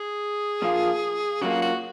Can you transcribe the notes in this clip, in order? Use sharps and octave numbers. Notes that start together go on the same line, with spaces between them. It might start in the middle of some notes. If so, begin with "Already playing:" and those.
Already playing: G#4
A#2 F3 A#3 F4
C#3 F#3 A#3 F4 F#4
F#4